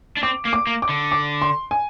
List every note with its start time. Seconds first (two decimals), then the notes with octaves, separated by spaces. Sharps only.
0.17 D4
0.23 C4 D6
0.45 A#3
0.53 D6
0.67 A#3
0.82 D6
0.89 D3
1.12 D6
1.42 C6
1.71 G#5